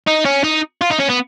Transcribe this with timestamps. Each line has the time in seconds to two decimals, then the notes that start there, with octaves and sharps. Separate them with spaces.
0.07 D#4
0.25 C#4
0.44 D#4
0.81 F4
0.90 D#4
0.99 C#4
1.09 B3